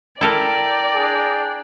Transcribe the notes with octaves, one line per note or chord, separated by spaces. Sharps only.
E4 A4 A#4 D5 G5 A#5
D4 G#4